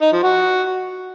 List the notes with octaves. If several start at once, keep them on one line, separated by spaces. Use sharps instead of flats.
D#4
F3
F#4